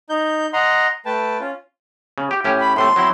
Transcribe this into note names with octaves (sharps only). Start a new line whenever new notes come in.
D#4 G6
D#5 F#5 A#5 C6
A3 B4 G5 A5
C#4 F4
C#3
G4
A2 C#4 G4
B5
A2 C3 A3 C6
F#3 C4 E4